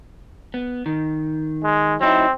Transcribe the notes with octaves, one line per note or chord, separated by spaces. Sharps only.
B3
D#3
G#3
F#3 C4 D#4 E4